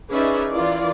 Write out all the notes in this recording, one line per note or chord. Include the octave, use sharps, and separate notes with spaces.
C#4 D#4 G#4 B4 D5 E5
E3 F4 A#4 D5